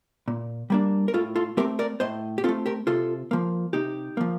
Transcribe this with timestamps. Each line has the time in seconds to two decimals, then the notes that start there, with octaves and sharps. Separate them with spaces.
0.28 A#2
0.70 G3 A#3 D4
1.08 A#4
1.14 A2 F4 A4
1.36 F4 A4
1.57 A3 C4 G4 A#4
1.79 A#4 D5
2.00 A2 C5 D#5
2.38 G4
2.44 C4 F4 A4
2.49 A3
2.66 G4 A#4
2.87 C3 F4 A4
3.31 F3 A#3
3.73 C3 D#4 G4
4.17 F3 A#3